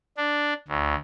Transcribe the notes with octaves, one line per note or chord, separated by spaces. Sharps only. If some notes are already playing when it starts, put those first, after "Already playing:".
D4
D2